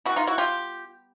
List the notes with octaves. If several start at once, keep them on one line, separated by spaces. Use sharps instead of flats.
E3 G3 B3 E4 F#4
D#4 F4
E4 F#4
F4 G4